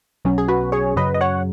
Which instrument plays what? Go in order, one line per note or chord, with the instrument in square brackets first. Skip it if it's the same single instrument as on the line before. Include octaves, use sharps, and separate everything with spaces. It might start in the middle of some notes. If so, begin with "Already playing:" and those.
[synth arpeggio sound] B1 B2 F#3 C#4
G#4
F#4 B4
G#4 C#5
F#2 C#3 F#3 B4 D#5
D#5
C#5 F#5